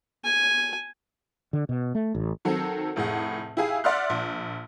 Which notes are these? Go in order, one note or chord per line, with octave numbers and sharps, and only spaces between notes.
G#5
D3
B2
A3
A1
D#3 F#3 C4 A4
F1 A2 G#4 F#5
E4 G4 G#4 F5 G#5
D5 E5 F#5 C6 F6 F#6
A#1